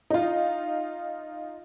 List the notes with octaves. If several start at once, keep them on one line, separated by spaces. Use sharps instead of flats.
D#4 F4